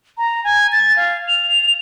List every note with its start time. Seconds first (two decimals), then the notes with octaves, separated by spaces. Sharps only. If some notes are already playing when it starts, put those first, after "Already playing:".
0.18 A#5
0.44 G#5
0.72 A6
0.96 F5
1.28 F7